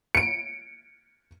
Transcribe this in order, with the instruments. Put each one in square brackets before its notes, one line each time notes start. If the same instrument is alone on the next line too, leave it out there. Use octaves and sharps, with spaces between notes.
[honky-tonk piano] C#7 D7